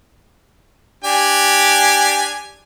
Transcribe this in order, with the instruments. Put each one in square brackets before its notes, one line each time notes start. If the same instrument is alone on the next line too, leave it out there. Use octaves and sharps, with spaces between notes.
[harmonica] D4 G4 G#5